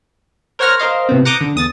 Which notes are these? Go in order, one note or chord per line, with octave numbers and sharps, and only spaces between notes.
A#4 C5 C#5 F#5 F6 A#6
A#4 C5 D#5 F5
A2 C3 B3 C4
F#5 A#5 D6 D#6 G6
D3
E2 D#6 A6